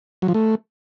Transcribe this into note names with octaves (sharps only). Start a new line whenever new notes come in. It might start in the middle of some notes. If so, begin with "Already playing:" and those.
F#3
F3
A3